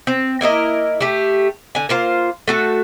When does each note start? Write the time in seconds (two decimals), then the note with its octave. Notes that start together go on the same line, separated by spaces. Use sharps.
0.07 C4
0.41 A#3 E4 A#4 D#5
1.01 A3 G4
1.75 D3 G#5
1.89 A#3 F4 C5
2.48 A3 F#4 A4